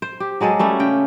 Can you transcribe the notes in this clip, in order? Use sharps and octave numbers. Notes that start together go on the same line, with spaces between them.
C5
G4
F#3 G#3 G#4 A4
G3 A3 C#4
C#3 G5